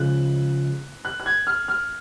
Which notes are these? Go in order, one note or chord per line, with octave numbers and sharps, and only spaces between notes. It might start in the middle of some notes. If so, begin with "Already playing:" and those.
Already playing: C#3 F3 G#3 F#6
F#6
F#6
G#6
F6
F6